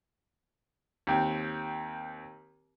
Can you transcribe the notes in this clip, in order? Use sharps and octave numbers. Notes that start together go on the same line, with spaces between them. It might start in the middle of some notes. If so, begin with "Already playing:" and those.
D#2 C4